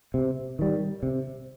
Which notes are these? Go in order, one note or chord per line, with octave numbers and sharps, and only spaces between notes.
C3
D#3 G3
C3